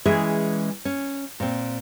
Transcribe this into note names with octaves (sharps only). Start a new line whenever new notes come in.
E3 G#3 C#4 G#4 E5
C#4
A#2 C4